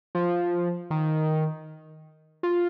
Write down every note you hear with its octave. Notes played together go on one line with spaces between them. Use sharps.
F3
D#3
F4